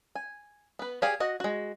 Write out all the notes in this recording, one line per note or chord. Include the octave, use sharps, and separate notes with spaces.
G#5
B3 B4
G4 G#4 D5 F5 G#5
F#4 D#5 F#5
G#3 F#4